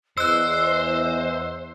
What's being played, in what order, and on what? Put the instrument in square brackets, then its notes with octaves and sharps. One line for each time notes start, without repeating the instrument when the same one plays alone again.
[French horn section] E2 [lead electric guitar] C5 [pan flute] D#5 [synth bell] E6 F#6